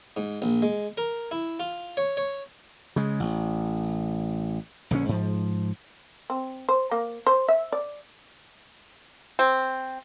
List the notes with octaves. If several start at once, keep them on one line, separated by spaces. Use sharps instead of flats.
G#2
A#1
G#3
A#4
E4
F4
C#5
C#5
C#3 G#3
A1
A#1 D3 E3 C#4
G#2 F3
C4
C5
A#3
C5
E5
D5
C4